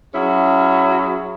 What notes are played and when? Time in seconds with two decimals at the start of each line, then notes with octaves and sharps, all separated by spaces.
0.14 F#3 C#4 E4 F#4 G#4